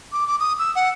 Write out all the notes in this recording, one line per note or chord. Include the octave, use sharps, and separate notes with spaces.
D6
D6
D#6
E6
F#5